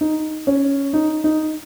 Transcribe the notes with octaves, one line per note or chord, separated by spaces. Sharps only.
D#4
C#4
D#4
D#4